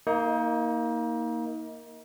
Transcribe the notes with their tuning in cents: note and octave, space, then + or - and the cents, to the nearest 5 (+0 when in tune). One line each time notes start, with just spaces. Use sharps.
A#3 +0 D#4 +30 A#4 +0